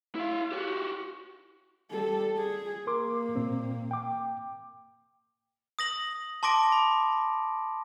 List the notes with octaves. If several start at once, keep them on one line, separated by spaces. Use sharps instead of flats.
E4 F5
F#4 G4
G3 A4
G#4
A#3 A#4 C6 D6
A#2 C4
G5 D6
D#6 A#6 F#7
A5 C6 D6 A#6 D7
B5